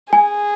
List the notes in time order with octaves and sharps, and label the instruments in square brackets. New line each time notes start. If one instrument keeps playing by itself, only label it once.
[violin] G#4 [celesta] G#5